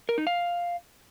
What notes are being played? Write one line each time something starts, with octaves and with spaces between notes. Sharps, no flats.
A#4
D#4
F5